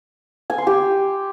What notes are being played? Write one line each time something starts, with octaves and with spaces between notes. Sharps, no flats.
G#5
C6
G4